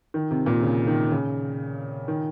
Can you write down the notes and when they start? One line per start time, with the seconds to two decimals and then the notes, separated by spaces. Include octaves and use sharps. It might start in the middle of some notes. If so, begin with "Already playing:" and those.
0.14 D#3
0.31 C3
0.46 A#2
0.63 C#3
0.87 D#3
1.12 C#3
2.08 D#3